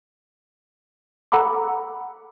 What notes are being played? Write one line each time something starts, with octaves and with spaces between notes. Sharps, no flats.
A4 F#5 A#5 B5 D6